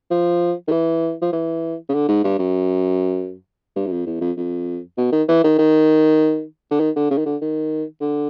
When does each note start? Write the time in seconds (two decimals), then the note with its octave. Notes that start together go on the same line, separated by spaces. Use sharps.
0.11 F3
0.68 D#3
0.72 E3
1.22 F3
1.33 E3
1.89 C#3
1.94 D3
2.09 G#2
2.24 G2
2.39 F#2
3.76 G2
3.86 F#2
3.92 F2
4.07 E2
4.21 F2
4.37 F2
4.97 B2
5.12 D#3
5.29 E3
5.44 D#3
5.59 D#3
6.71 D3
6.80 D#3
6.96 D3
7.10 C#3
7.18 D#3
7.26 D3
7.42 D#3
8.01 D3